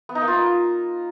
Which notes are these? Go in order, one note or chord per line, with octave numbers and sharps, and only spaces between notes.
B3
D#4
A#3
F4
D#4